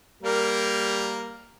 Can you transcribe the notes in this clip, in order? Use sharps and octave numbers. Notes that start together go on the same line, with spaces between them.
G3 A#3 A#4